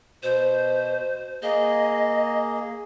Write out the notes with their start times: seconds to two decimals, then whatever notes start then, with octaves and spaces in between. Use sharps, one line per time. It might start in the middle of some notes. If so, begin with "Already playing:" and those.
0.23 B2 C5
1.43 A#3 G#4 D#5